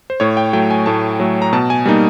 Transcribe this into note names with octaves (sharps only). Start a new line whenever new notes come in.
C5
A2 C#5
G5
F#3 A3 G5
G#5
A2 A5
F#3 A3
A#5
B2 A5
G#5
G3 A#3 D#4